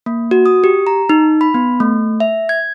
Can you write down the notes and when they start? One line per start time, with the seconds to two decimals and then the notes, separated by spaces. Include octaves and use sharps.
0.06 A#3
0.31 F#4
0.46 D#6
0.64 G4
0.87 A#5
1.09 D#4
1.41 B5
1.54 B3
1.80 A3
2.20 E5
2.49 G#6